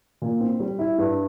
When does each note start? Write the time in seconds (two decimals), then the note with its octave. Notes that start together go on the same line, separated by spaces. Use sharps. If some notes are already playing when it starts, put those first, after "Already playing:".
0.22 A#2
0.41 C4
0.60 G3
0.79 E4
0.98 G2